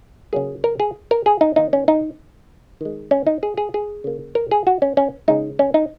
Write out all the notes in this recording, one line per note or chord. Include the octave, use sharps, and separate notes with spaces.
C#3 F#3 A#3 G#4
A#4
G#4
A#4
G#4
D#4
D#3 A#3 D#4
C#4
D#4
D#3 G#3
C#4
D#4
G#4
G#4
G#4
C#3 A#3
A#4
G#4
F#4
C#4
C#4
C#3 G#3 D#4
C#4
D#4